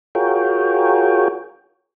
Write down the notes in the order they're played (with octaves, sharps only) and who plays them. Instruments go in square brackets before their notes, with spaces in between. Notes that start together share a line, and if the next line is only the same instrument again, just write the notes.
[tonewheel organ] F4 F#4 G#4 A#4 C#5 G5